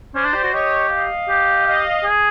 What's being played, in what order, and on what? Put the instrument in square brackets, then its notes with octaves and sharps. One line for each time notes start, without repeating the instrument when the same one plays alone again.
[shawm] C#4 [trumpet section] C5 D5
[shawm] D4
G4
F#4
[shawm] G4 [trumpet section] C#5 D#5
[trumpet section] D#5 F5
[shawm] G4
[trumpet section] D#5 F5
[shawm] G#4